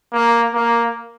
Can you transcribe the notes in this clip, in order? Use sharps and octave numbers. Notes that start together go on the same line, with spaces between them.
A#3
A#3